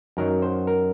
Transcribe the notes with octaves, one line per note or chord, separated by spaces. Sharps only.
F#2 D#3 F#3 A#4
C5
A#4